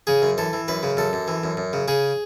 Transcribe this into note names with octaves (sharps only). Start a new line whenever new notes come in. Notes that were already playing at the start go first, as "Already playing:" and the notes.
C#3 G#4
F#2
E3 A4
E3
F#2 B4
C#3
F#2 A4
F#2
E3
F#2
F#2
C#3
C#3 G#4